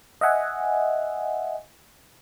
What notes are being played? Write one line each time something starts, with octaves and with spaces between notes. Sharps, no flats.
D#5 E5 F#5 G#5